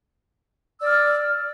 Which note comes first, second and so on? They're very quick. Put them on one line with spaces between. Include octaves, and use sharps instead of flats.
E6 D5 F6